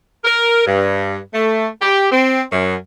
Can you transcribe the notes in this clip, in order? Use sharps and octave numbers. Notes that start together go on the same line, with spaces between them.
A#4
G2
A3
G4
C4
F#2